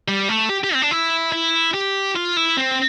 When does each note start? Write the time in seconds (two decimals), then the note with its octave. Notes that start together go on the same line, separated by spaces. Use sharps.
0.08 G3
0.29 A3
0.49 G4
0.64 G4
0.74 C4
0.82 D4
0.91 E4
1.32 E4
1.74 G4
2.16 F4
2.37 E4
2.57 C4